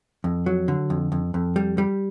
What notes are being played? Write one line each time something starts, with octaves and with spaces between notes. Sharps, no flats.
F2
F#3
D3
F2
F2
F2
G3
G3